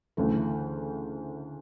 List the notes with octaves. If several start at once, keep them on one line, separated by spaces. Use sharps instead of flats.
D2 C#3 E3 A3